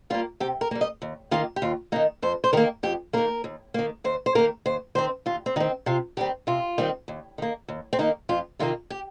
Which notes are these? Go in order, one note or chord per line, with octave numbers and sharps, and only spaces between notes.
G3 A#3 F4
C3 G4
A#4
G3 A#3
D#5
D#2
D#3 A#3 F4
G4
D#2 F4
D#3 A#3 D#4
F2 C5
C5
D#3 A#3 A#4
F2 G4
D#3 A#3 A#4
D#2
D#3 A#3
D#2 C5
C5
D#3 A#3 A#4
D#2 C5
D#3 C4 C5
D#2 F4
C4
D#3 C4 D#4
C3 F4
D#3 G3 C4 G4
C3 F4
D#3 G3 C4
D#2
D#3 A#3
D#2
C4
D#3 A#3 D#4
F2 F4
C3 D#3 G3 A#3 F4
G4